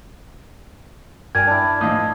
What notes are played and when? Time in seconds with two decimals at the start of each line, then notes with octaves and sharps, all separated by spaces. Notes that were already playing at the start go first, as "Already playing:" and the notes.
1.35 G2 A#4 D5 G5 G#5 G#6
1.47 D4 E4
1.81 A2 F3 D#5 F5 D#6